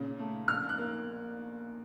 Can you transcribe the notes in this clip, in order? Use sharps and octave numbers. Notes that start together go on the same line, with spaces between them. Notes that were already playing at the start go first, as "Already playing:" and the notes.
Already playing: A#2 C#3
A3
A#1 F6
F#6
A#3